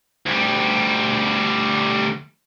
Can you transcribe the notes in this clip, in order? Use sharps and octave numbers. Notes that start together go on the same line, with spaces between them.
D2 G3